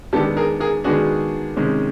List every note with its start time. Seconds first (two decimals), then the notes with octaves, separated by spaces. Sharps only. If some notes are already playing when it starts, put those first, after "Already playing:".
0.13 D#3 G#3 B3 D4 G4 A4
0.37 G#4 A#4
0.60 G#4 A#4
0.84 D#3 G#3 B3 D4 F#4 G#4
1.56 C3 D#3 G#3 C#4